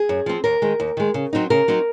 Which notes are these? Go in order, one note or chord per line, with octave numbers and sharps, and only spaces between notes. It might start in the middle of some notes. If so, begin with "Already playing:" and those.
Already playing: G#4
F#2
F3 C4
D#2 A#4
D#3 G#3
D#2
D#3 G#3
C#3
F#3 C4 D#4
C#3 A#4
F#3 C4 D#4